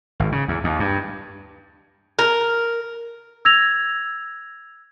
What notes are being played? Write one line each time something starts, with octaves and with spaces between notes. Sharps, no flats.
G#1
C#3
E2
D#2
G2
A#4
E6 G#6 A#6 F7